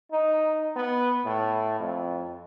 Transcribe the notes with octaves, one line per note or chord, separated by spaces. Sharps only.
D#4
B3
A2
F2